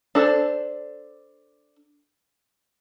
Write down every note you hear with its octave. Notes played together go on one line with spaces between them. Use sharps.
D4 A4 C5